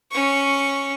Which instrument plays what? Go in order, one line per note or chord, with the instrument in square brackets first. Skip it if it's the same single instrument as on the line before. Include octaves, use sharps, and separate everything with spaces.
[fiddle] C#4 C#6